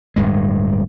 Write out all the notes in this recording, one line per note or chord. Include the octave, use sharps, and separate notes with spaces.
D1 G2 G#3